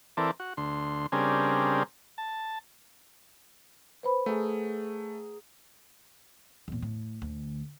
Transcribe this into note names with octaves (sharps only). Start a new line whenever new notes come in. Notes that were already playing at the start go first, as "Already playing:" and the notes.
E3 C4 A4 A#4 D5
F#4
D2 C6
C#3 G3 C4 D4 G#4 A#4
A5
B4 C5 B5
A3 G#4 A#4 F#5
E2 A#2
A2
D2